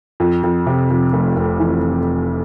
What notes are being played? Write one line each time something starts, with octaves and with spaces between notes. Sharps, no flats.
F2
F2
C3
F2
F1
F1
E3